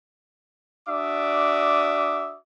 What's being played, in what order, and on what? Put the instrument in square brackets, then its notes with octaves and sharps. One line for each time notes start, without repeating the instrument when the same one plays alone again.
[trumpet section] D4 F#4 D5 E5 D6 D#6